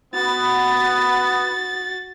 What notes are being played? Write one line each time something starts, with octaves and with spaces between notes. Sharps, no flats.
B3 F#4 A6